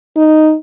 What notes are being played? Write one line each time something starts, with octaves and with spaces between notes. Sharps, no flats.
D#4